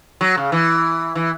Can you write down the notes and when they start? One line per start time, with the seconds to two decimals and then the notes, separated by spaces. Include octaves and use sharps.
0.21 F#3
0.37 C#3
0.52 E3
1.15 E3